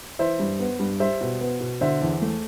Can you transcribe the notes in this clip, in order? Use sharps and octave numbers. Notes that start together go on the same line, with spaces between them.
E3 C5 E5
G2
B3
G2
G3 C5 E5
B2
B3
B2
D3 C5 E5
E2
A3